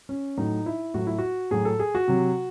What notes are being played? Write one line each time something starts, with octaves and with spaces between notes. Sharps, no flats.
C#4
A2 F#3 D#4
E4
A2 F#3 F#4
E4
F#4
A2 F#3 G#4
A4
G#4
F#4
C3 F#3